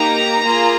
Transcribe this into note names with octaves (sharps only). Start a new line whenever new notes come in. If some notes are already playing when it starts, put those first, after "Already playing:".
Already playing: A#3 D#4 G4 A#5
A#3 F4 G#4